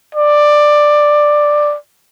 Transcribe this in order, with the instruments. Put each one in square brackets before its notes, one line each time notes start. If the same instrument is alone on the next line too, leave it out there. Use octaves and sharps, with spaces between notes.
[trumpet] D5